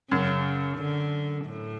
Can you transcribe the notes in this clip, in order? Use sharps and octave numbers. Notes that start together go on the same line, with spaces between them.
F#2 C#3
D3
A2